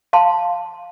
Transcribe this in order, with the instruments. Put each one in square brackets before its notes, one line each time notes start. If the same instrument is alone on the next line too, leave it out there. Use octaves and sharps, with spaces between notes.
[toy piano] F5 A5 C6